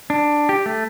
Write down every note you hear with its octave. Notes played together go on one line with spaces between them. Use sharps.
D4
G4
A3